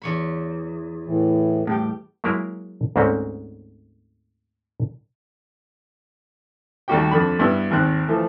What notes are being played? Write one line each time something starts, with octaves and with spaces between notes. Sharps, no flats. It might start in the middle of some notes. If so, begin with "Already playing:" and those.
E2 C#5 B5
A2 E3
A2 G3 G4
F#3 G#3 A#3 E4 G#4 A#4
D2 G#2 G#3 A#3 C4 C#4
D#2 G3 A3 F#4 G4 G5
F2 D3 B5
G2 B3 E4 E6
G#1 D#2 C4 F#6
E3 F3 A3